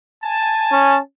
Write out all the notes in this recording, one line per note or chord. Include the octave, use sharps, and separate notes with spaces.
G#5 A5
C#4